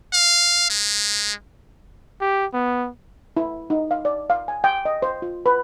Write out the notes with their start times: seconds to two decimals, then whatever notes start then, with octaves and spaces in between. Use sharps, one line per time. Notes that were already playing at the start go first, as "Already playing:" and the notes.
0.13 F5
0.70 G#3
2.21 G4
2.53 B3
3.37 E4
3.70 D#4
3.91 F5
4.05 D5
4.30 F5
4.48 G#5
4.64 G5
4.85 D#5
5.02 C5
5.22 F4
5.46 B4